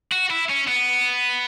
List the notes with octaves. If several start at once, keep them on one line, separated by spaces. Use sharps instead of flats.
F#4
E4
C#4
B3